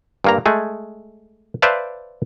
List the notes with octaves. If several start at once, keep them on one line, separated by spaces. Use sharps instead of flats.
G2 A#3 A#5
G#3 A3 G#4
B4 C5 D5 E5 F5 A5